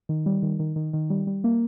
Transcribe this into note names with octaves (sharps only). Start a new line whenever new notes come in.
D#3
G3
D#3
D#3
D#3
D#3
G3
G3
A#3